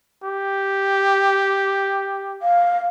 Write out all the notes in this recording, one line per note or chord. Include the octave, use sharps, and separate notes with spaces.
G4
F5